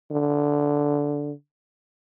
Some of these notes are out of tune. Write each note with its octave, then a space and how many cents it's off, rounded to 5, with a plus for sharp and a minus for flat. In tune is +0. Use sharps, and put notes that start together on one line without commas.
D3 -10